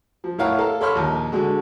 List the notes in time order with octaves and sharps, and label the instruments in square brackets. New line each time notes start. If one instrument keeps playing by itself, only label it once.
[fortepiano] F3
A2 E4 A#4 C#5 F5 F#5
A4 A#4 F5
A4 C#5 B5 C6 F6
A#1 D#2
D3 G#3 F#4